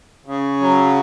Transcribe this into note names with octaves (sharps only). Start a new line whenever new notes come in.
C#3
F#3